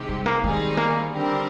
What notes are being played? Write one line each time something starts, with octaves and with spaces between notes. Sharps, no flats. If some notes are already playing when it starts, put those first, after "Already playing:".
Already playing: C3 D#3 G#3 C4 G4
G3
A#3
D#3 G3 G#3 C4 D#4 G#4
A#3
D3 G3 C4 G4 A#4